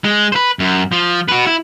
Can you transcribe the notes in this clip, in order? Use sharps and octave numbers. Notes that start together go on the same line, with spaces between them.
G#3
B4 C5
F#2
F3
F#4 B4
E4